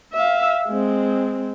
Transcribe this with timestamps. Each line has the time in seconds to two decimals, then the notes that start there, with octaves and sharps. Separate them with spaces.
0.13 E5 F5
0.67 G#3 C4